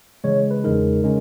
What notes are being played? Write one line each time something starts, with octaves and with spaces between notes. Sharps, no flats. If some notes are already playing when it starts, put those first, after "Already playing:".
C#3 E3 G#3 C#5
B4
E2 C#3 G#3 D#4 A#4
C#3 G#3 C#4